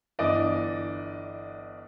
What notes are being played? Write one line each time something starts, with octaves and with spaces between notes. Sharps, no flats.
G1 E3 D4 D5 D#5